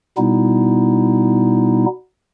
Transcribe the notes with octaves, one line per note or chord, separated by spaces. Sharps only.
B2 G3 B3 D#4 E4